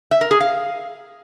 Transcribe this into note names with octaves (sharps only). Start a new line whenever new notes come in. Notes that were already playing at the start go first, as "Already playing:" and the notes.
E5
A#4
G#4
F5